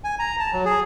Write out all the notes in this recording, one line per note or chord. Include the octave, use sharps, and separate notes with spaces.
G#5
A#5
A5
F#3
G#4